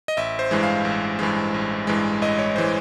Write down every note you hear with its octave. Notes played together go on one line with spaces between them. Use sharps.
D#5
A1 E5
C5
G2 E3 G#3
F5
A1
G2 E3 G#3
A1
G2 E3 G#3
A1 D#5
C#5
E3 G#3 C5